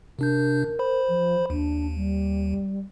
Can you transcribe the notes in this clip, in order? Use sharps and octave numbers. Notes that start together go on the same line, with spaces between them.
C3 D4 A#4 G6
C5 B5
F3
D#2 D4
G3